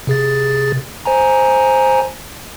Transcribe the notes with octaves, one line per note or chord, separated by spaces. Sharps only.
C3 G#4 A6
C5 G#5 A#5